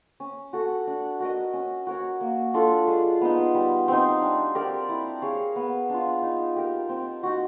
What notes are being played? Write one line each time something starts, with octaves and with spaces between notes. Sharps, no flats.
C#4
F#4 A4
D4
F#4 A#4 D#5
C#4
F#4 A#4 C#5
A#3
D4 F4 A4
G#3
B3 D#4
G3
C4 D#4
D4
G4 A#4 D5
E4
G#4 C#5 F5
B3
D4 F4
D#4
G4 A#4
C4
D#4 F#4